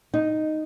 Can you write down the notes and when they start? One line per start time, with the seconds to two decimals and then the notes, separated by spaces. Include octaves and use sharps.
0.14 D#4